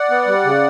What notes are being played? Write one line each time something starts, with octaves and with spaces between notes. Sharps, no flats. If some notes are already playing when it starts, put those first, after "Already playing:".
Already playing: D5 F#5
B3
G3
C#3